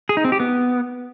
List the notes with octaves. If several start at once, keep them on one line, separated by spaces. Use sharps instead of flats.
G#4
D#4
C4
G4
B3